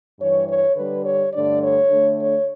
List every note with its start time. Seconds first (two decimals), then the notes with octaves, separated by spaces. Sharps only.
0.20 G2 E3 G3 C#5
0.48 C#5
0.76 D3 G3 D4 B4
1.05 C#5
1.33 G2 D3 A3 D4 D5
1.62 C#5
1.90 D3 A3 D4
2.20 C#5